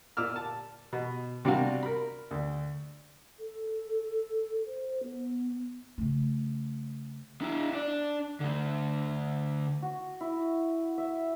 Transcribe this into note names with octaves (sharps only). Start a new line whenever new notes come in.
A#2 D6 E6 F6
A5
B2
C3 G3 D4 F#4 F5
A#4 B5
D2
A4
C5
B3
C#3 A3
D4 E4
D4 D5
D3 A3
F#4
E4
E5